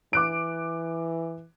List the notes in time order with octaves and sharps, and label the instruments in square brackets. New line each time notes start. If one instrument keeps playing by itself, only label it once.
[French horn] E3 [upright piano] D6 F#6 D7